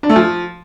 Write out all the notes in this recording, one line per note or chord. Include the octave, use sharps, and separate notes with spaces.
D4
A3
F3